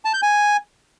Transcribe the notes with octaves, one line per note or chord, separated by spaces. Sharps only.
A5
G6
G#5